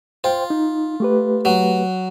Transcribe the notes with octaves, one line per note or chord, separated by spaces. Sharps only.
F4 C5 G5
D#4
A3 G4 B4
F#3